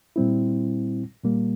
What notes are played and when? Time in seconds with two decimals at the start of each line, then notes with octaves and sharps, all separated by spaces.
0.16 A#2 G3 C4 E4
1.24 A#2 G3 A#3